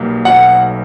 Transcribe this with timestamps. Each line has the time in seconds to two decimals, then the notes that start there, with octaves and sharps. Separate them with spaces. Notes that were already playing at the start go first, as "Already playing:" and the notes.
Already playing: B1 B2 G3 A#3
0.25 B1 B2 F#3 A3 F#5